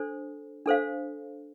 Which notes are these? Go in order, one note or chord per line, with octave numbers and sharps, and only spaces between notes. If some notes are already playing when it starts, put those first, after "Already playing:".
Already playing: D4 A4 C5
D4 A4 C5 F5